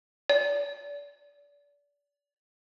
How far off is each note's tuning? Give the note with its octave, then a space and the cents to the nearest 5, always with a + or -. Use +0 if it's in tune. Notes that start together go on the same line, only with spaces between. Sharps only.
D5 -30